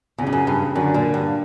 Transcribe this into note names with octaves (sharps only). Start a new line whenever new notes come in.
E2 C#3
G2
F#2
G2
F#2 D3
A#2
G2